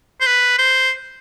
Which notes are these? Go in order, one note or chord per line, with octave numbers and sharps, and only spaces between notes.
C5
B4
C5